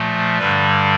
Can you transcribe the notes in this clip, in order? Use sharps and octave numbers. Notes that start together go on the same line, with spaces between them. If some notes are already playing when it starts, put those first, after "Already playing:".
Already playing: A#2 F3 A3
G2 D3 G3 B4